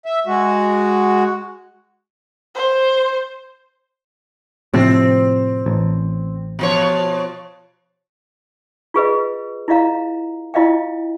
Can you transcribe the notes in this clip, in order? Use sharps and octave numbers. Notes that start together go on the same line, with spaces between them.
E5
G#3 F#4
C5
A2 C3 F3 C4
A1
B2 F3 C#5
F4 G#4 B4 D#5
E4 F4 D#5 F5 A#5
E4 F4 D#5 F5 G5